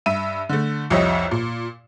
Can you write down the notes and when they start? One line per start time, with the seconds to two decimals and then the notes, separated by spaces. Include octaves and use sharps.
0.06 G2 E5 D#7
0.49 D3 A3
0.90 C2 F2 G4 C#5 D#5 E5
1.31 A#2